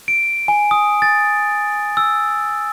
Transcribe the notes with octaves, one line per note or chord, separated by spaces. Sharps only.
D7
G#5
D#6
A6
E6